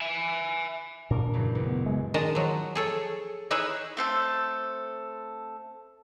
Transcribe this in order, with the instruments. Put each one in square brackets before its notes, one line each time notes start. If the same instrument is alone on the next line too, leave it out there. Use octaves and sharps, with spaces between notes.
[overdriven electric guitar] E5 G#5
[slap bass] A#2 D4 [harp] A#4
[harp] F#2 C#3 E3
A1
[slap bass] B3
G#3
[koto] D#3 G#3 D#5 A5
F3 F#3
G#4 A4 C#5
D#4 E4 G#4 B4 C#5 E5
[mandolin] A3 C4 A4